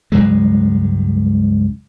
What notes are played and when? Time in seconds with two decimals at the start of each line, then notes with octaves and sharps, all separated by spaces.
0.12 C#2 G2 F#3 G#3